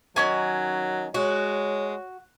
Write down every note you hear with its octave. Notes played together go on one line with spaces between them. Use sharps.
D#3 F#3 C#4 G#5
G#3 F#4 C#5